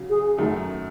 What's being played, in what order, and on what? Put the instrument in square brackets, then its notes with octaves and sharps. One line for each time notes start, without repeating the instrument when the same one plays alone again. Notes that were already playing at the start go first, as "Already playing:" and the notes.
Already playing: [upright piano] C#3 F#3
[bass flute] G#4
[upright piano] F#2 D#3 F#3 A3